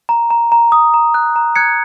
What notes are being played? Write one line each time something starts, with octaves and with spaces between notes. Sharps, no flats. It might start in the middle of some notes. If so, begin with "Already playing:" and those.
A#5
A#5
A#5
D#6
A#5
F#6
A#5
F#6 G#6 C#7